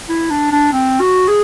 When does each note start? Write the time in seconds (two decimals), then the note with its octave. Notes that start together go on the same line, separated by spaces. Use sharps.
0.09 E4
0.30 D4
0.52 D4
0.73 C4
1.00 F#4
1.28 G#4